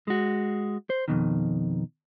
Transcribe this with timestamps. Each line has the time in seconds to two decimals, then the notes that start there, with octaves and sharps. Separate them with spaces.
0.07 G#3 F#4
0.90 C5
1.08 F2 G#2 B2 D#3